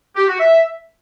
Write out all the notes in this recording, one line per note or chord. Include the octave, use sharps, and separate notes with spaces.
G4
F#4
E5